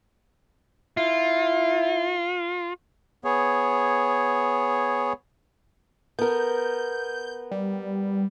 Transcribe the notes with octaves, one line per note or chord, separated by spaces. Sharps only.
E4 F4
B3 G#4 C#5
B3 A#4 G6
G3